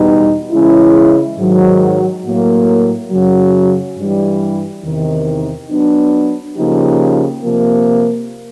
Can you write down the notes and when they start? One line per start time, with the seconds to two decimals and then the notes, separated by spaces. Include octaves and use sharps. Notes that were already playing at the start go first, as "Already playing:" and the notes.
Already playing: E2 B2 G3 B3 D#4
0.51 C#3 E3 G#3 C#4 E4
1.37 G#2 D#3 F#3
2.24 A2 F#3 A#3
3.11 F#2 C#3 F#3
3.97 G2 E3 G3
4.84 E2 C3 D#3
5.70 F#3 B3 D4
6.57 C#3 F3 A#3 D#4 G4
7.42 C3 F3 A#3